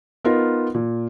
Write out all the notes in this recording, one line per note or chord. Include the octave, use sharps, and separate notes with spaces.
B3 D#4 F4 A#4
A#2